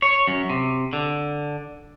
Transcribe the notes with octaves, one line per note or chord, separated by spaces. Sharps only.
C#5
F#2
C3
D3